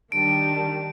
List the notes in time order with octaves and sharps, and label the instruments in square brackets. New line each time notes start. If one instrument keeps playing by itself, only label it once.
[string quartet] D#3 G3 D4 G4 [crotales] D7